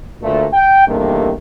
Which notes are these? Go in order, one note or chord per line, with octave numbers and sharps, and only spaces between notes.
D2 A#2 A3
G5
E2 G2 C3 D#3 A3 A#3